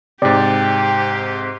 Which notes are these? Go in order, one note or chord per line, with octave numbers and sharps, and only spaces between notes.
G#2 C3 G4 D5 G5